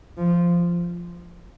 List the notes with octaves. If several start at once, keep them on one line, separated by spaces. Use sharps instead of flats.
F3